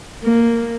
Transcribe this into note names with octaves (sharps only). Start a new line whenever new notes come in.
A#3